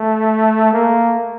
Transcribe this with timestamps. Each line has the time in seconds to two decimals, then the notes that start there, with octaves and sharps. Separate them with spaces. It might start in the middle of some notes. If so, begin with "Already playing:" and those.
Already playing: A3
0.73 A#3